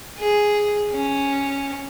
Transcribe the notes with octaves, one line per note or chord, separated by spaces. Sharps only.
G#4
C#4